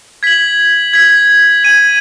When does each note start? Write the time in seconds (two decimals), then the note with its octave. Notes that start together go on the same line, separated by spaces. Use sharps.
0.23 G#6 B6 F#7
0.93 G#6 B6 F#7
1.64 G#6 D#7 F#7